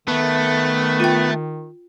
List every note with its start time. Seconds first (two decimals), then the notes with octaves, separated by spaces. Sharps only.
0.08 D#3 A3 B3
1.00 F4 G5